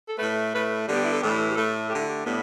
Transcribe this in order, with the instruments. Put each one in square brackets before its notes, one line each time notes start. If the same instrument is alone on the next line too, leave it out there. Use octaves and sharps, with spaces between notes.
[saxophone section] A4
A2 A3 B4
A2 A3 B4
D3 G3 B3 A4
G4
E4
A4
A2 E3 A3 G4
G4
A2 A3 A4
D3 A3 G4
E4
G4
A2 G3 B3